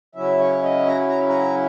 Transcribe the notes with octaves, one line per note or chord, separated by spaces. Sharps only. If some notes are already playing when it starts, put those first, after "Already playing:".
C#3 F#3 C#4 E4 E5
C#5
D#5
A#5
A#5
A#5